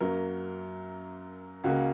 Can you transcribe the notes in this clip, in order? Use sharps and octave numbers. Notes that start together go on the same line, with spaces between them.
F#2 F#3 A#3 A#4
C#2 C#3 A#3 F#4